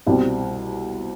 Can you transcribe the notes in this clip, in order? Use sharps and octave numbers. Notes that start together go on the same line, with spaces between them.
C2 B2 G3 C4